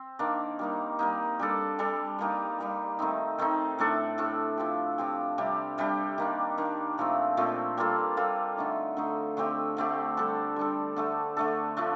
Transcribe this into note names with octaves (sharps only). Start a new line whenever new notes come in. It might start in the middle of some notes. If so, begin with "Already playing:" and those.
Already playing: C4
D#3 A#3 D4
G3 A#3 D#4
G3 A#3 D#4
G3 D4 A4
G3 D4 A4
G3 A#3 D#4 G4
G3 A#3 D#4 G4
D#3 A3 C4 D#4
D#3 A3 C4 D#4
A2 A3 D4 A4
A2 A3 D4 A4
F3 C4 G4
F3 C4 G4
C3 G3 D4 G4
C3 G3 D4 G4
D#3 A#3 D4
D#3 A#3 D4
A#2 F3 A3 C4
A#2 F3 A3 C4
G3 A#3 F4 A4
G3 A#3 F4 A4
D3 A3 D#4
D3 A3 D#4
D3 A3 C4 G4
D3 A3 C4 G4
G3 D4 A4
G3 D4 A4
D3 A3 D4 A4
D3 A3 D4 A4
F3 A3 D4